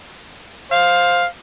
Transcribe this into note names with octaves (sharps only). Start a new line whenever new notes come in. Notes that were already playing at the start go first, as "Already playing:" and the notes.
C5 F5